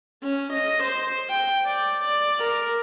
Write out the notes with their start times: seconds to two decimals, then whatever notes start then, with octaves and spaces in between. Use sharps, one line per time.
0.23 C#4
0.53 D#5
0.83 C5
1.30 G5
1.66 D5
2.04 D5
2.40 A#4